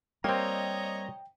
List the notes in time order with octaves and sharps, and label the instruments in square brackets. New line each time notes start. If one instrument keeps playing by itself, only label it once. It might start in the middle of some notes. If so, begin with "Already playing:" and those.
[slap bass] G3 [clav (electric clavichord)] A#3 C4 [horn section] C#5 D#5 A#5 [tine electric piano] G5